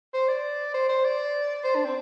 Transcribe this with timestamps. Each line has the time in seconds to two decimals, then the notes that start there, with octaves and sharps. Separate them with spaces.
0.14 C5
0.29 D5
0.74 C5
0.89 C5
1.04 D5
1.64 C5
1.75 D4
1.85 C4